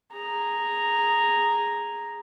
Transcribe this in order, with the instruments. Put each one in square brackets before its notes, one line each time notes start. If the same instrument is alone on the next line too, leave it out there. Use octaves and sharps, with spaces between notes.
[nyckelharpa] G#4 A#5